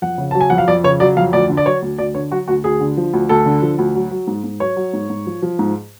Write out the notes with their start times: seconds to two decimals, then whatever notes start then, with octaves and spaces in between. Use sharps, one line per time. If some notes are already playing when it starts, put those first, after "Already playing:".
0.02 F2 F#5
0.18 C#3
0.31 F#3 A5
0.41 G#5
0.50 F2 F#5
0.58 F5
0.68 F2 D5
0.84 C#3 C#5
1.00 F#3 D5
1.17 F2 F5
1.33 D2 D5
1.50 D3
1.57 D5
1.66 F#3 C#5
1.82 D2
1.98 D2 D5
2.15 D3 C#5
2.31 F#3 F#4
2.48 D2 F#4
2.64 D2 G#4
2.81 D3
2.97 F3
3.13 D2
3.29 D2 A4
3.46 D3
3.62 F3
3.78 D2
3.95 F#3
4.11 F#3
4.27 G#2
4.44 G#2
4.60 F#3 C#5
4.77 F#3
4.94 G#2
5.10 G#2
5.26 F3
5.42 F3
5.59 G#2